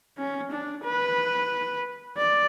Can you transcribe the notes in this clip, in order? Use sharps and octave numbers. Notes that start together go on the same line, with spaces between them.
C#4
D4
B4
D5